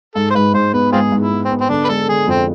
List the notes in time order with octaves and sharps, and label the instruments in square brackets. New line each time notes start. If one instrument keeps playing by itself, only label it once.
[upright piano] G#2 [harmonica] A4
[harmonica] C5
[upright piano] G#2 [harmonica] B4
[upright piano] G#2 [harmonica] C5
[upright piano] B3 [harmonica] B4
[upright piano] G#2 [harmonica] C4 F4 G#4
[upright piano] G#2
[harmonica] E4
[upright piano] B3
[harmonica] C4
[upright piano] B3
[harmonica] C4
[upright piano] D3 [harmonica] D4
[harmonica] B4
[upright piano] G#3 [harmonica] A4
[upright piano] D3 [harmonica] G#4
[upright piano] F2 [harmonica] C4